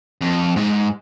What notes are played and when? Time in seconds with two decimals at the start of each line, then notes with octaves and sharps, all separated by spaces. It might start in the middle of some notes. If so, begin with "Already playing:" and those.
0.21 F2
0.56 G#2